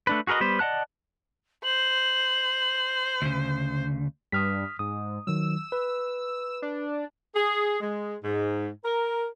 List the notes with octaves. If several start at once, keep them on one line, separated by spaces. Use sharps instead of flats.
A3 D4 B4
F#4 G#4 A#4 B4 D#5
G3 B3 B4 C5
D5 D#5 F#5 A5 F#6
C5 F#7
D2 C#3
G2 D#6 F6 B6
G#2 D#6
D#3 F#3 E6
B4
D4
G#4
G#3
G#2
A#4